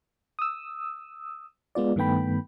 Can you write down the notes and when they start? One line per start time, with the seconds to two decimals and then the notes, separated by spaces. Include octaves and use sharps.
0.39 D#6 E6
1.75 G#3 B3 F4 D5
1.96 G2 D#3 A3 B3 G5 B5